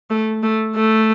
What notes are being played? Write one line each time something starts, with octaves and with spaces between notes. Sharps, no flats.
A3
A3
A3